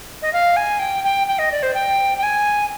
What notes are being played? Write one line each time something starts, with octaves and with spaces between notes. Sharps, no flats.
D#5
F5
G#5
G5
G5
G5
D#5
D5
C5
G5
G5
G#5